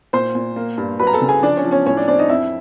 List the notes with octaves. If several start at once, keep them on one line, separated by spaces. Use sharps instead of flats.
A#2 C5 C6
A#2
A#3
G2
F#3 B4 B5
A#5
A4 A5
C#3
G#4 G#5
F3 D4 D5
C#4 C#5
F3
C#4 C#5
A2 C#4 C#5
D4 D5
C4 D4 D5
D#4 D#5
F2 E4 E5